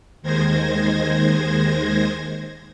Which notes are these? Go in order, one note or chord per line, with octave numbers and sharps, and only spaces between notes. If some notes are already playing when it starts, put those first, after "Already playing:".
D#2 D#3 G#3 C5 G#6 A#6